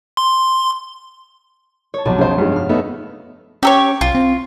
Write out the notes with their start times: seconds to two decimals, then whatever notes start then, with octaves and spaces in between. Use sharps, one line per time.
0.17 C6
1.94 C#5 A5
2.05 F1 B1 A5
2.18 F1 C#3 C5
2.38 G2 G#3
2.52 F5 F6
2.69 A3 B3 D#4 E5
3.63 C#4 G4 A4 C#5
4.01 B1 F4
4.15 C4